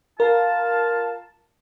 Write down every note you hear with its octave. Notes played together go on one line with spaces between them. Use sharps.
F4 A#4 F5 A5